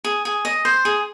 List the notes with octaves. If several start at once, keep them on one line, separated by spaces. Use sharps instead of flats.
G#4
G#4
D#5
C5
G#4